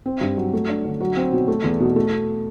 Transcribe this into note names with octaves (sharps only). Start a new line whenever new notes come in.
C4
G2
F#3
A3
D4
D3
F#3
C4
B2
A3
E2
B2
A3